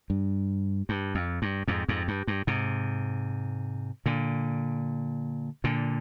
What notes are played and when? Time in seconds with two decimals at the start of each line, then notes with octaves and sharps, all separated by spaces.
0.10 G2
0.89 G2
1.15 F2
1.42 G2
1.68 F2 G#2
1.88 F2 G#2
2.08 G2
2.27 G2
2.47 G#2 C3
4.06 A#2 D3
5.64 A#2 D3